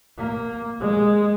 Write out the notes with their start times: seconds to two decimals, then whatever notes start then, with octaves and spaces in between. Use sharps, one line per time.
0.18 A#3
0.81 G#3